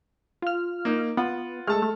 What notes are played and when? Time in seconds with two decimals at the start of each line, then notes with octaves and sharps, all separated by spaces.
0.42 F4 F6
0.85 A#3 D#4
1.17 B3 F4 F#5
1.67 G#3 A3 A4 A5 F6
1.82 A3